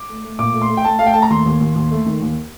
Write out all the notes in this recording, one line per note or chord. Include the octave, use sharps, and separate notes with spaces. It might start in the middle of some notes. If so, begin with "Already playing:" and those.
Already playing: D6
A3
A3
A#2 D6
A3
C6
A3
G5
A3 A5
A3 F5
G5
A3 A5
A#5
D#2 C6
D#2
D#2
D#2
A3
D#3
D#2